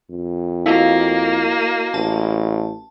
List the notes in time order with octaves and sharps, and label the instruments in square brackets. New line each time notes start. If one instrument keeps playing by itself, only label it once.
[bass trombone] F2
[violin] A#3 [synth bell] E4 [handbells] F#4 D#5 F5
[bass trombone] A1 [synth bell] A5